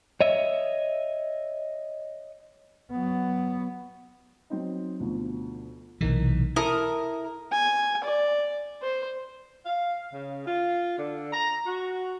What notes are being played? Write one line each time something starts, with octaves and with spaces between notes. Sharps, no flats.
C#5 D#5 E5
F#3 B3
F#3 C4 D#4
D2 B2 F3
B1 C3 E3 A#3 D#4 A#4
E4 A4 A#4 D#6
G#5
D5
C5
F5
C#3
F4
D3
A#5
F#4